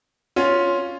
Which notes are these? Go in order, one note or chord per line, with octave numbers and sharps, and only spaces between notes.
C#4 F4